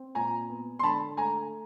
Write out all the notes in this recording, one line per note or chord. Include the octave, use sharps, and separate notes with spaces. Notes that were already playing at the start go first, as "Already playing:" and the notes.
Already playing: C4
A#2 G#5 A#5
B3
C6
D3 A5 B5
A3 G#5 A#5